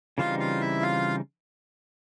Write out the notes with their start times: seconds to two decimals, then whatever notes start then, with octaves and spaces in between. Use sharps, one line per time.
0.18 C#3 E3 G3 C4 D#4 F4 F5
0.39 F4 F5
0.61 E4 E5
0.82 F4 F5